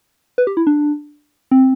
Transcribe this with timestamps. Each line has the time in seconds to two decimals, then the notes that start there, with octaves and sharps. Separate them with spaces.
0.38 B4
0.47 G4
0.57 E4
0.67 D4
1.51 C4